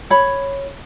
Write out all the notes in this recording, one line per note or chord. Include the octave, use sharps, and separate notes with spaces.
C#5 B5